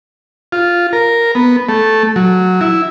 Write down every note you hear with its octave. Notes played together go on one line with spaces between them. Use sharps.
F4
A#4
B3
A3
F#3
E4